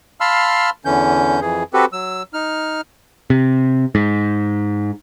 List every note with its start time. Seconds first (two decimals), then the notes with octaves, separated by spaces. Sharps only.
0.20 F5 A5 B5 C6 E6 F6
0.85 E2 D3 E3 C#4 G6
1.41 F2 E3 G#4
1.73 C4 F#4 G4 A4 B4
1.93 F#3 E6
2.34 D#4 F6
3.30 C3
3.95 G#2